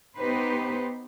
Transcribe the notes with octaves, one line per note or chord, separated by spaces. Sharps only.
B3 D#4 G4 B4 C5